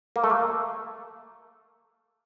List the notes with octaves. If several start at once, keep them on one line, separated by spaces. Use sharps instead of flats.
A#3
A3
A#3